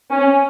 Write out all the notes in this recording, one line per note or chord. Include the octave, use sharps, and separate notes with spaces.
C#4